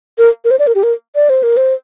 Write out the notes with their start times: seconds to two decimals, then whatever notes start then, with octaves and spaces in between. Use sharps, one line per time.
0.18 A#4
0.45 A#4
0.51 C5
0.59 D5
0.67 A#4
0.75 G4
0.83 A#4
1.16 D5
1.29 C5
1.43 A#4
1.57 C5